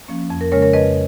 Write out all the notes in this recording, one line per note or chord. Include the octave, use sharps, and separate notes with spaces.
F3 A#3 C#4
F2
A#4
C#3 G#3 C#4 A#4 C#5
A#4 C#5
F2 B4 D#5